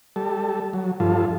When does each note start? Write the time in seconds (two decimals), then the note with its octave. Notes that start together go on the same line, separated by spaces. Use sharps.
0.16 G3 A4
0.73 F#3
1.00 G2 F3 F4 A4